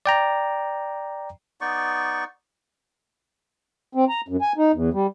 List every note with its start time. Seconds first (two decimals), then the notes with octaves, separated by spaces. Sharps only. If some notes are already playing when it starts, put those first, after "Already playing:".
0.06 D5 G5 A#5
1.61 B3 D#4 D5 C#6
3.95 C4
4.09 A#5
4.28 F#2
4.41 G#5
4.58 D#4
4.74 E2
4.93 G3